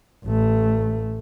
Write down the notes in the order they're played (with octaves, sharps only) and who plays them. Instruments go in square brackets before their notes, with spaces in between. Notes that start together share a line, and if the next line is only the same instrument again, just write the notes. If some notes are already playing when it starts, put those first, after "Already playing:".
[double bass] A1 A3